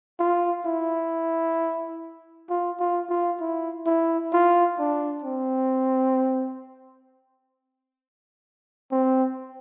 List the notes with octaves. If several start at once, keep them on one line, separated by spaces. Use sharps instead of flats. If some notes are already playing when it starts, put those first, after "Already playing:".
F4
E4
F4
F4
F4
E4
E4
F4
D4
C4
C4